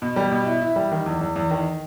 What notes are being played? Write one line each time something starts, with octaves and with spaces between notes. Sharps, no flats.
B2
G3
B2
E4
E4
G3
D#3
E2
E2
E2
D#3